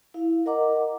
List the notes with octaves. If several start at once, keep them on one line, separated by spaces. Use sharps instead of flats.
E4 F5
A#4 D#5 F#5 A#5 D6